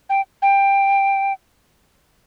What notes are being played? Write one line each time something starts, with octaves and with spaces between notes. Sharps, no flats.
G5
G5